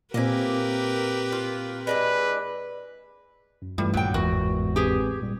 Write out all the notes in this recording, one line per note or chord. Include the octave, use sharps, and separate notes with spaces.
A#2 A#3 C4 G4 A#4 B4 E5 G#5
F4
G#3 D4 E4 B4
F#2
G2 E3 G3 A3 F4
A#1 D#2 F#3 G5
G1 E2 G#2 F#4 A#4
C4 G4 G#4 B4
A#2 G3